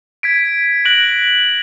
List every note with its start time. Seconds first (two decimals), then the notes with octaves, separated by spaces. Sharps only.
0.23 G#6 B6 D7
0.85 F#6 A#6 D7 F#7